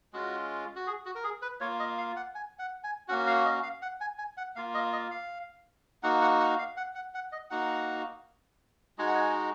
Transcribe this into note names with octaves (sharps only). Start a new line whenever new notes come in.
G#3 C#4 F4 F#4
F#4
G#4
F#4
A#4
G#4
B4
A#3 F4 C#5
D#5
F5
F#5
G#5
F#5
G#5
A#3 C#4 F#4 F#5
F5
D#5
F5
F#5
G#5
G#5
F#5
A#3 F4 F5
D#5
D#5
F5
A#3 D#4 F#4 F#5
F#5
F#5
F5
F#5
F#5
F#5
D#5
A#3 D#4 F#4 F#5
G#3 D#4 F#4 G#5
F#5
G#5